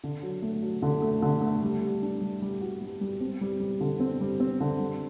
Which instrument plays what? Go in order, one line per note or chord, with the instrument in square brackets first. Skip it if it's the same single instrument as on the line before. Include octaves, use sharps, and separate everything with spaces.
[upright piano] D3
F#3
A3
F#3
D3
A3
D3
A3
G3
G3
D4
G3
G3
F#4
G3
G3
C4
G3
G3
D3
C4
G3
C4
D3
G3